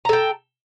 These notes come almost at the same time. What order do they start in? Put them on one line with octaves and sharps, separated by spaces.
A#5 A4 G5